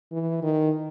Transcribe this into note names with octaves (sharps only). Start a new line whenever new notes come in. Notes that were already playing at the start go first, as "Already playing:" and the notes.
E3
D#3